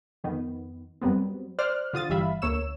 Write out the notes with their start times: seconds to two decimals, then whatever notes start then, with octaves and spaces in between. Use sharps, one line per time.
0.24 F2 D#3 B3
1.01 F#2 F#3 G3 B3 C4
1.59 C5 D5 F6 F#6
1.93 D3 F4 D#6 A6
2.09 G1 E3 G3 E5 F5 B5
2.42 D2 A#3 C#5 E6 E7